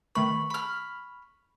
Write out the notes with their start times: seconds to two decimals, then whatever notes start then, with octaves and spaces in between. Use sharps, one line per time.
0.15 D#3 A3 B4 B5 C#6
0.50 B5 F6